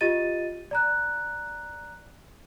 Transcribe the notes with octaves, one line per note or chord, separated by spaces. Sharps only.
F4 G4 D#5 A6 D#7
D5 A#5 F#6